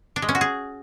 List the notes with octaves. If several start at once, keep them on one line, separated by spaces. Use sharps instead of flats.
D4
G#3
C#4
F#4
G#4